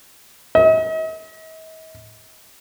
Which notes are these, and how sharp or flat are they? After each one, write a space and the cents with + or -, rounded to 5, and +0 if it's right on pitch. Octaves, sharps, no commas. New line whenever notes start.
D#5 +45